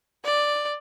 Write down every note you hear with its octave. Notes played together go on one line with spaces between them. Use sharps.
D5